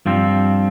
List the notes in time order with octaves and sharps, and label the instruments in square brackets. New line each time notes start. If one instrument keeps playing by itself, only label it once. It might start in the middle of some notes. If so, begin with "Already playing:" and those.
[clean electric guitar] G2 F3 C4